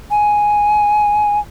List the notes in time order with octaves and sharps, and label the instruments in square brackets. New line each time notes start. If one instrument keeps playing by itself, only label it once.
[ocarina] G#5